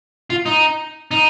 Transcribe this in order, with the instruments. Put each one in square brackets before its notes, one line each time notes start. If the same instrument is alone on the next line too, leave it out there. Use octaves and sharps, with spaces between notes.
[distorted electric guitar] F4
D#4
D#4